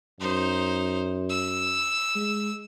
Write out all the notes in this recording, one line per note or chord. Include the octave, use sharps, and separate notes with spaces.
F#2 D#4 C5
E6
G#3